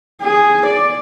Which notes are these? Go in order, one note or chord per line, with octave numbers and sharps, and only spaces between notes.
G#4
D5